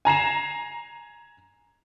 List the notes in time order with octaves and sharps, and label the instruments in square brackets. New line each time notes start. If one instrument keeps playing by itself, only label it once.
[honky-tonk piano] G#5 A#5 C7 E7